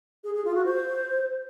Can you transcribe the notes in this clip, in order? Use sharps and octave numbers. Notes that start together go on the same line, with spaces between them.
G#4
G#4
F4
F#4
C5